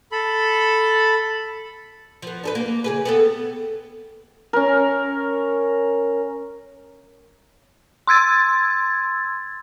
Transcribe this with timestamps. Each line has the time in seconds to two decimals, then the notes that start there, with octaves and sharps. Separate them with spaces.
0.12 A4 B5
2.22 F3 B3
2.44 D4 A4 B4
2.55 A#3
2.84 C#3 G#4 B4
3.05 B3 C4 A4
4.53 C#4 A#4
8.07 C6 E6 G#6 A6